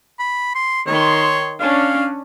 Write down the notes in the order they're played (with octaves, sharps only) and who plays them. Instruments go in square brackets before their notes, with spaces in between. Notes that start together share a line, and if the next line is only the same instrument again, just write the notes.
[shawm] B5
C6
[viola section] D#3 C6 [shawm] C#5
[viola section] C#4 D4 [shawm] F5